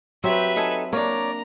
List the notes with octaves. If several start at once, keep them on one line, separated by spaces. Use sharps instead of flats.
F#3 C4 G4 B4 E5
D#4 A4 G#5
A#3 D4 C#5 D5 A#5